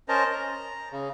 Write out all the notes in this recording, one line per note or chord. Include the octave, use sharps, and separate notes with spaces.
C#4 A#4 C5 D#5 A5 A#5
A#5
C#3